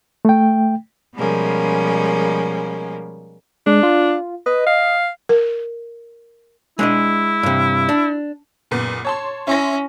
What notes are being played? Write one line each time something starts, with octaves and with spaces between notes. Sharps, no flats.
A3 G5
B2 F3 G3 G#3 A#3 C#4
G#3 D4
F4
B4 D#5
F5
A#4
G#3 D4 E4 D#5
G2 C3
D4
F#1 A#2 B3
C#5 A5 C6
C#4 E4 C6 A#6